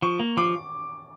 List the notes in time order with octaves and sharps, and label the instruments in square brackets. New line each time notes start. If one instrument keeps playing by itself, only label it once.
[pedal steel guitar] F3 [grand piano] C#6
[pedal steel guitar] A#3
[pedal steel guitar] F3 [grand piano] D6